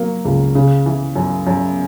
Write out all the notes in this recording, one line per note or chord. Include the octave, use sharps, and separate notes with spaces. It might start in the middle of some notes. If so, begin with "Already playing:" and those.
Already playing: F#3 A#3
C#2
C#3
E3
F#2
F#2